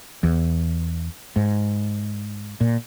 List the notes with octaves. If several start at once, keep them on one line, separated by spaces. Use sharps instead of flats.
E2
G#2
A#2